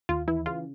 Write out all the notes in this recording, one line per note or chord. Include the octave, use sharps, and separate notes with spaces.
D#2 F4
E3 E4
C#3 F4